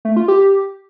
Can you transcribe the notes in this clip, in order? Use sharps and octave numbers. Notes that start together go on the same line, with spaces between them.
A3
F4
G4